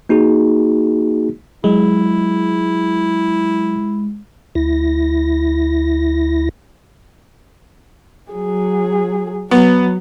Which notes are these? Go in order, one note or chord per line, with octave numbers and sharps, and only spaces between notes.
A#3 D#4 F#4 G#4
F#3 G#3 E4
D2 E4 A#6
F#3 G#4
F#3 B3